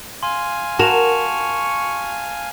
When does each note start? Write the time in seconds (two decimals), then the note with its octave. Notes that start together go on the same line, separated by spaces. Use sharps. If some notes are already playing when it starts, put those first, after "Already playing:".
0.23 F5 G#5 C6
0.79 F#4 A#4 A5 C#6 E7 F7